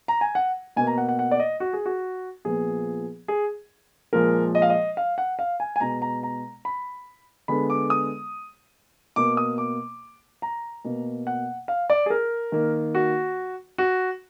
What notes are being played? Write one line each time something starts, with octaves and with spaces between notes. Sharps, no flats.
A#5
G#5
F#5
B2 A#3 G#5
A#5
F#5
F#5
F#5
D5
D#5
F#4
G#4
F#4
A#2 F3 B3 G#4
G#4
A#2 F3 G#3 A#4
D#5
F5
D#5
F5
F#5
F5
G#5
G#5
B2 G#3 B3 A#5
A#5
A#5
B5
D3 G#3 B3 B5
D6
D#6
B2 A#3 D6
D#6
D6
A#5
B2 A#3
F#5
F5
D5
G#4
A#4
D#3 A#3
F#4
F#4